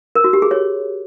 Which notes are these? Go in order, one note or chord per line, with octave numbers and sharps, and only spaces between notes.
A#4
F#4
G4
G#4
C#5